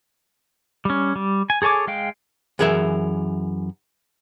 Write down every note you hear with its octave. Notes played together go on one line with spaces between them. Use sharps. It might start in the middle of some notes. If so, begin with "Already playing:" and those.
G3 C#4
G3
G#5
G#4 A4 C#5 G#5 D6
G#3 F5 G5
F#2 E3 G#4 A#4 E5